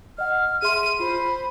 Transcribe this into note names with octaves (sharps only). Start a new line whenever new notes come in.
D#5 F#5 F6
G#4 E5 C6 D#7
F4 C5 B5